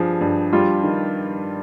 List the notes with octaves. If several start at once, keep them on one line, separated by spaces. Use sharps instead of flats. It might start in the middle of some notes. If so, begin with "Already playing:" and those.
Already playing: G2 F3 G#4
G2
G3 F4
D#3